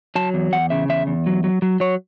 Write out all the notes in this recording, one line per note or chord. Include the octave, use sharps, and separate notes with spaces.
F#3 A5
E2
E2 F#5
C#3 E5
E2 E5
E2
F#3
F#3
F#3
F#3 C#5